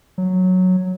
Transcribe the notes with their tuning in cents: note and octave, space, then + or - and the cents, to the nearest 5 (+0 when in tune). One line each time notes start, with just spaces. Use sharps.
F#3 -5